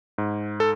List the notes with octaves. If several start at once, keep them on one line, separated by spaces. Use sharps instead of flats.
G#2
A4